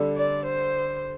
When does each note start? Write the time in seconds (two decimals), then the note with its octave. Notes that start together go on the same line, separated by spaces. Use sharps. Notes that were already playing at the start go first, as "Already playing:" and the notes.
Already playing: D3 G3 D4 A4
0.16 D5
0.45 C5